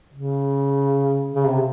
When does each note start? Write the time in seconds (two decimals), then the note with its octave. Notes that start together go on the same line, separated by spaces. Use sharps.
0.14 C#3
1.34 C#3
1.47 C3